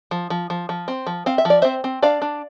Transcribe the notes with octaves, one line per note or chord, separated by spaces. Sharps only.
F3
F3
F3
F3
C4
F3
C4 F5
E5
F3 D5
C4 C5 E5
C4
D4 D5 F5
D4